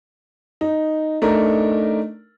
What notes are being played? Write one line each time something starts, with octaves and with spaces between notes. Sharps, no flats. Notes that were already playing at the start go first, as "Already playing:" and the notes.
D#4
A3 D4 D#4 A#4